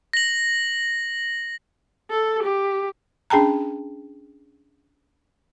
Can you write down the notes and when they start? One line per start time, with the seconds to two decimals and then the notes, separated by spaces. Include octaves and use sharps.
0.13 A#6 F#7
2.10 A4
2.43 G4
3.30 C#4 D4 G#4 G5 A5 A#5